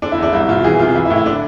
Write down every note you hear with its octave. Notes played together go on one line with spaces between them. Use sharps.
D3 D4
E4
E2 D4
C2 E4
B2 F4
E3 G#4
C3 F4
E3 E4
E4
A2
E4
D3 D4